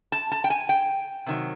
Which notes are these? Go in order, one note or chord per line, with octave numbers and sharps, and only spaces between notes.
A5
A5
G5
G#5
G5
C3 D#3 F#3